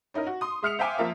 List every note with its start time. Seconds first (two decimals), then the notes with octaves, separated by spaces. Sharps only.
0.14 C#4 D#4 E4 A#4 D#5
0.27 F#4
0.41 C6 D#6
0.62 G#3 E5 F6 C7 C#7 F7
0.79 C5 E5 F5 G5 G#5 D6
0.98 F3 A#3 F4 A#4 E5